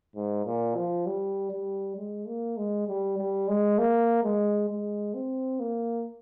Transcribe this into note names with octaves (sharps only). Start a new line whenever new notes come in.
G#2
A#2
F3
G3
G3
G#3
A#3
G#3
G3
G3
G#3
A#3
G#3
G#3
C4
A#3